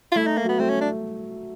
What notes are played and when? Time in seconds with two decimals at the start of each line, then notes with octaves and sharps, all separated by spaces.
0.12 F4
0.16 A3 E4
0.27 D#4
0.37 A#3
0.44 F#3 B3
0.59 A3 C4
0.69 C#4
0.81 D4